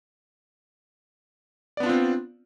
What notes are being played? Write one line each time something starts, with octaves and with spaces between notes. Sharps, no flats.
B3 C4 D4 F4 D5